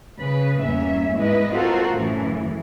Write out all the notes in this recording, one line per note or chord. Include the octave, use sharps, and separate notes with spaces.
C#3 B4
E2 G2 A#3 C#4 E5
G#2 G#3 E4 B4 D#5
C4 F4 F#4 A4 A#4 C5
F#2 A2 C#3 E3